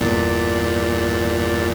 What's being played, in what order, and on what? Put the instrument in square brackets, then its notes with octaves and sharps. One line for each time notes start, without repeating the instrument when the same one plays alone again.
[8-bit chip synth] G1 E2 A#2 [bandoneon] D5